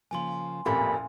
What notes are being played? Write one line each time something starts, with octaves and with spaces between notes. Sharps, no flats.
C#3 F3 A#3 G#5 C6
A1 F2 A#2 G4 A4 A#4 B5